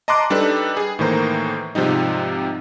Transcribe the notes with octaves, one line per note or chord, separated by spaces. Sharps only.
D#5 A5 A#5 C6 D6 F#6
G3 D4 D#4 A4 B4
G#4
A2 D#3 E3 A#3 C5 A#5
G#2 C3 F3 G3 D#4